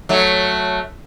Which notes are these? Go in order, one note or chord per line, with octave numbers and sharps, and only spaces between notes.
F#3 A3